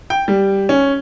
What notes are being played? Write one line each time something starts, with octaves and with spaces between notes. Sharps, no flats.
G5
G3
C#4